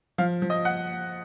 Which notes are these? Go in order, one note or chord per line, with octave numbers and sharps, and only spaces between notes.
F3 F5
F3
D#5
F#5